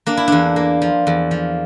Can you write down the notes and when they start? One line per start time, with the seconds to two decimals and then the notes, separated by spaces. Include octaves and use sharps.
0.06 A#3 D4
0.17 E4
0.28 E2 D4
0.56 A#3
0.82 F3
1.07 E2
1.31 F3